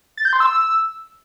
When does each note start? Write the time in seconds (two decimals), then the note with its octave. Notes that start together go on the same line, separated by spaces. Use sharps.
0.17 A6
0.25 G6
0.33 C6
0.40 E6